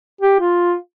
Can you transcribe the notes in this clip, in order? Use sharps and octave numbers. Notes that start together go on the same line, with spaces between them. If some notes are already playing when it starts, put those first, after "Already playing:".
G4
F4